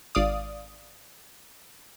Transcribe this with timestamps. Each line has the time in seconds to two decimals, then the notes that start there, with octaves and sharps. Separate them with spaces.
0.15 G#1 D5 F5 D#6